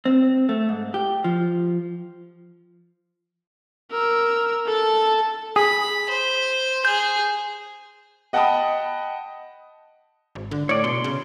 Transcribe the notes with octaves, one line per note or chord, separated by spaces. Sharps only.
C4
A3
G#2
G4
F3
A#4 E6
A4 A5
G#4 B5
C5
G#4 G6
D#5 F#5 G5 A5 B5 D#6
G#1
D3
A2 C#5 D5
B2 C6
C#3